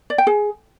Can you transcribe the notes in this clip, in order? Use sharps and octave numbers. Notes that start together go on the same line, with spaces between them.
D5
G5
G#4